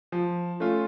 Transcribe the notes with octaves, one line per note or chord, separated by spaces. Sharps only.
F3
A3 C#4 F4